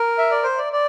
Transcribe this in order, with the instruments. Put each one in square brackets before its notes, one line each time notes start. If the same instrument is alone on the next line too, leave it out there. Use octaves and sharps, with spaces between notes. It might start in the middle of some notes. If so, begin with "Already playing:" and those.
Already playing: [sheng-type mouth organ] A#4
E5
D5
C5
D5
D5